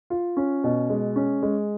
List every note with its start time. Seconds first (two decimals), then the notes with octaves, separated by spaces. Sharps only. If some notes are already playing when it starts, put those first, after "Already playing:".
0.10 F4
0.37 C#4
0.64 B2
0.90 G#3
1.16 C#4
1.43 G#3